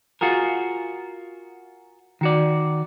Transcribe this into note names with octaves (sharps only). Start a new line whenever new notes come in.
F4 F#4 G#4 A#4
D#3 F#4 D5